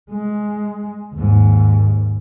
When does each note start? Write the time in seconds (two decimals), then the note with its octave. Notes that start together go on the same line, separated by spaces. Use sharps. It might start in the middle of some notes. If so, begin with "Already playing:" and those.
0.10 G#3
1.14 D#2 G#2